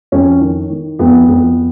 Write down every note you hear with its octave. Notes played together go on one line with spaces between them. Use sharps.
F2 C#4
D#3
D#3
F2 B3
F2